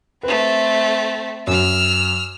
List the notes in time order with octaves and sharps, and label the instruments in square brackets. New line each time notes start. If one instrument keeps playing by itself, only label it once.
[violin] A3 C4 [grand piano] B4
[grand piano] F#2 [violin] E6 F6